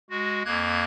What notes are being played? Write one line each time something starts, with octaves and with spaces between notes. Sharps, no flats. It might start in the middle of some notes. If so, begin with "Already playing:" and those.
G#3 F#4
F2 A#3 F#6 G#6